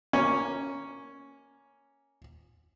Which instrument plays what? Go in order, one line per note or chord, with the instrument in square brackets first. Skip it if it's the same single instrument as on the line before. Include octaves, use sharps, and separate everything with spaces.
[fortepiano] A#3 C#4